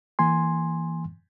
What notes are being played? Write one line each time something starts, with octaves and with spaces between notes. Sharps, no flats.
E3 A#3 G#5 C6